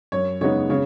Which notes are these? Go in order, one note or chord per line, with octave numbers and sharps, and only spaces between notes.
F#2 C#5
C#3 G#3 B3 D#4 C#5
C#3 C#5